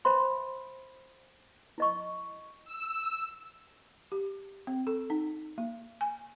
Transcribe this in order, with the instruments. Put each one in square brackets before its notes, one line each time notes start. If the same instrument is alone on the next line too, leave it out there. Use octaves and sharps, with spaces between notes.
[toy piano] C5 E5 B5 C6
E4 D#5 C#6
[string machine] E6
[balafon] G4
C4
A4
D#4
A#3
G#5